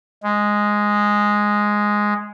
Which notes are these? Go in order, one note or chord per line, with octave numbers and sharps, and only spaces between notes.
G#3